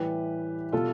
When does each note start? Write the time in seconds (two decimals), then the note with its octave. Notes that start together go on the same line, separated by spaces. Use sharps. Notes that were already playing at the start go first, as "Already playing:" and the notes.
Already playing: A2 E3 G3 G4 B4
0.73 B2 G3 B3 F4 A4